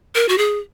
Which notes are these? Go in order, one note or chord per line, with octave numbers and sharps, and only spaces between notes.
A#4
F#4
G#4